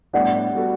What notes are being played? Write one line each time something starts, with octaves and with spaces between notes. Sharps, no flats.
A2 G3 B3 D4 D5 F#5
G3 B3 F#4 A4